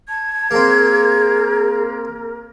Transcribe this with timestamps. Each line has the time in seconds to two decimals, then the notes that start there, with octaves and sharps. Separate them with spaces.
0.09 A5 G#6
0.51 A#3 C4 G#4 A#4